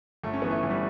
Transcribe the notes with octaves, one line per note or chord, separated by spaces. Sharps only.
G1 A3
C#4
E3 B3
A3
G1
G3